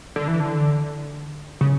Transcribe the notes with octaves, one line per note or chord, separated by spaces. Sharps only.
D3
E3
D3
C#3